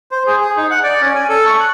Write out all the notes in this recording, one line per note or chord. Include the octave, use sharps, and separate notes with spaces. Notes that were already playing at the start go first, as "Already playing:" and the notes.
C5
G#4
G#4
D#4
F#5
D5
C#4
G#5
A4
C#6
F#6